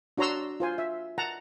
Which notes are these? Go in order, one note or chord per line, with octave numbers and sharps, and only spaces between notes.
D4 F#4 C#5 A#5 C6 E6
F4 C5 G#5
E5
F#5 A5 A#5